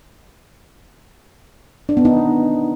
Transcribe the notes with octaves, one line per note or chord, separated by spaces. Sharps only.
D4
B3
D#4